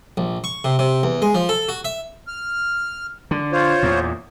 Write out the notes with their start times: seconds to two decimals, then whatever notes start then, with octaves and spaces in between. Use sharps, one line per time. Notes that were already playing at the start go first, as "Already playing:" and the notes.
0.17 A#1
0.44 C#6
0.64 C3
0.79 C3
1.03 E2
1.22 G#3
1.35 F3
1.49 A4
1.68 F#4
1.85 E5
2.27 F6
3.31 D3
3.52 F4 C5 C#5
3.83 E2 A#2